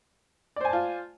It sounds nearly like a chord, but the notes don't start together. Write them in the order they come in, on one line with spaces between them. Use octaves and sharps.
D5 C5 G#5 A5 F4